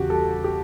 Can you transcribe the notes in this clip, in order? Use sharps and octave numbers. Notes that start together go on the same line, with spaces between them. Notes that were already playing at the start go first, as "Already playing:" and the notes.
Already playing: E2 C#3 F#4 G4
G3 A4
G4